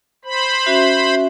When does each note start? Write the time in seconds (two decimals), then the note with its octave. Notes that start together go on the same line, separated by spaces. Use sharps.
0.25 C5 B5
0.66 C#4 F#4 E5